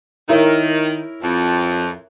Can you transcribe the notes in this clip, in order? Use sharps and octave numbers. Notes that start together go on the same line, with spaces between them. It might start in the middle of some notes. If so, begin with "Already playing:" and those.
D#3 E4 A#4 C#5
F2